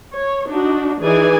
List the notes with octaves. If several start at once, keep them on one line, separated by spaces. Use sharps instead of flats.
C#5
D4 D#4 F#4
E3 D#4 G#4 D5 G#5